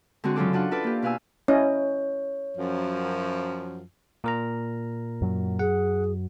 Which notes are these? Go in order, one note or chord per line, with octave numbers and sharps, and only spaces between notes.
D3 G#3 C4 F#4
F#2 C#3 F#3 F4 A4 D6
C#4 D4 F4 F#5
E4 F4 A4 B4 D5
A#3 G4
B2 B4 F5 G#5 E6
C#4 E4 C#5 D#5
F#2 F3
A#2 A#4 A#5
F#2 F#3
G#4 F#5